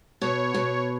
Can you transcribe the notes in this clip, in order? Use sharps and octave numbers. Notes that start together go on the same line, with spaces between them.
B2 C#5
B2